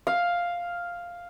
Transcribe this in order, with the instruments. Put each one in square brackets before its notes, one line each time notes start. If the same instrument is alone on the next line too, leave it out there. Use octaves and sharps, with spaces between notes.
[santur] F5